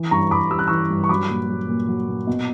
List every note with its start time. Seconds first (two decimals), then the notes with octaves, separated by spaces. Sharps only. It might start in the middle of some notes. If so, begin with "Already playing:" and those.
Already playing: E3
0.11 G2 A#5 C#6
0.31 G2 B5 D6
0.51 G3 E6
0.59 F#6
0.68 E3 C#6 E6
0.90 G2
1.04 C#6
1.09 F#3 B5 D6
1.29 A#2
1.48 F#3
1.68 A#2
1.88 F#3
2.08 A#2
2.27 B2